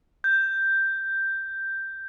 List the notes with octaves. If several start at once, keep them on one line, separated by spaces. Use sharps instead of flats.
G6